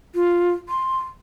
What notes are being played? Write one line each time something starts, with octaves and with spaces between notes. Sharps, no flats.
F4
C6